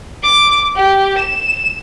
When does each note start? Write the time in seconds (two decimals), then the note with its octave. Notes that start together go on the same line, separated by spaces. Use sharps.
0.23 D6
0.76 G4
1.18 E7